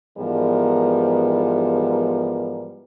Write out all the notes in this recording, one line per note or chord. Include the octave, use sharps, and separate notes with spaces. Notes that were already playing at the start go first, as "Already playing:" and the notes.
G#2 E3 F3 G3 B3 A#4